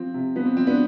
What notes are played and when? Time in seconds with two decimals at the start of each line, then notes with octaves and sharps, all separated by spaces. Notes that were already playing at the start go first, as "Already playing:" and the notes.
Already playing: F3 C4
0.14 C3
0.35 F3 B3
0.45 C4
0.57 F3 C4
0.67 B3 D4